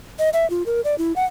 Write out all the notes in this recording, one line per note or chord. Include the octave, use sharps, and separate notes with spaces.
D#5
E5
F4
A#4
D5
E4
F#5